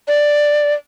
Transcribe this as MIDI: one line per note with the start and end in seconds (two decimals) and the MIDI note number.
0.08 0.73 74